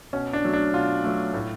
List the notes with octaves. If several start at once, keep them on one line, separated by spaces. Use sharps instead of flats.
B2 C#4
D4
F#3 A3
D4
B2 F4
F#3 A3
A2